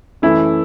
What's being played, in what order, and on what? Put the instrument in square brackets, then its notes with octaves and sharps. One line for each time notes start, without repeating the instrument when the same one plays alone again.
[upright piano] F#2 E3 A3 [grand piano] E4